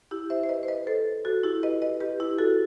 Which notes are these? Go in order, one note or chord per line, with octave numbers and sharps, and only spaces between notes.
E4 G4
C5 E5
C5
B4 D#5
C5
B4 D#5
A4 C5
F#4 A4
E4 G4
B4 D#5
B4 D#5
G4 B4
E4 G4
F#4 A4